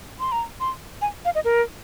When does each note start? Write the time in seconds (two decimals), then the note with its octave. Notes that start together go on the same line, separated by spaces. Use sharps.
0.20 C6
0.32 A#5
0.60 C6
1.02 G#5
1.25 F5
1.35 D#5
1.45 A#4